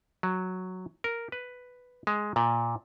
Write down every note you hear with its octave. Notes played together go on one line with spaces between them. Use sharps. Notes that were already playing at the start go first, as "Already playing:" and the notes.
F#3
A#4
B4
G#3
A#2